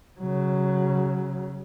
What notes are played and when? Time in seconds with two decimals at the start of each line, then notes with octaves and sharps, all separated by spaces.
0.20 C#3 F#3